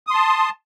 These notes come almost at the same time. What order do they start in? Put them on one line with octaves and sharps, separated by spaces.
D#6 C6 A5